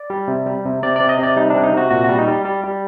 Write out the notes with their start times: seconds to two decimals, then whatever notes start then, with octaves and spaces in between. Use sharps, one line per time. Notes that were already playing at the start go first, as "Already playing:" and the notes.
Already playing: D5
0.10 G3
0.28 C3
0.46 G3
0.65 C3
0.83 C3 D5
0.96 C3 D5
1.09 D#5
1.19 C3 D5
1.37 G3 D#4
1.50 D4
1.55 C3
1.63 D#4
1.73 C3 F#4
1.91 A#2 F#4
2.04 F#4
2.09 G3
2.18 D#4
2.28 G3
2.45 G3
2.64 G3